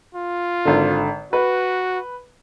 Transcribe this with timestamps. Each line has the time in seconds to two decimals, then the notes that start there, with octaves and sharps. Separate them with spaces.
0.15 F4
0.65 G#1 D3
1.33 F#4 B4